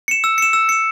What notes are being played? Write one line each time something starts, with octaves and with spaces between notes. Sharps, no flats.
C#7 E7
E6
C#7 E7
E6
C#7 E7